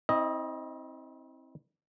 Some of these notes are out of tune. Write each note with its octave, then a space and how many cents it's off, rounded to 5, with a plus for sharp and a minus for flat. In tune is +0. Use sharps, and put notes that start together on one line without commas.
C4 +15 E4 -40 D#5 +0